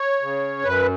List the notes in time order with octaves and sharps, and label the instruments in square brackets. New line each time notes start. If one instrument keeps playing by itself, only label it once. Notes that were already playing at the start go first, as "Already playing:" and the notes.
Already playing: [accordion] C#5
C#3
F#2 B4